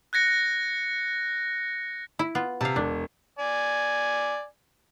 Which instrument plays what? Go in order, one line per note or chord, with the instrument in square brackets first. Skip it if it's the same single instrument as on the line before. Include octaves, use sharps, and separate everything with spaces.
[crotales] F#6 G#6 A#6 C#7
[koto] E4
B3 F4
[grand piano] C3 [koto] F5 A5
[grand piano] E1 [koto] D4
[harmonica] D5 G#5